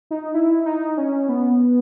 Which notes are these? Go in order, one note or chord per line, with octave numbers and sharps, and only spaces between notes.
D#4
E4
D#4
C#4
B3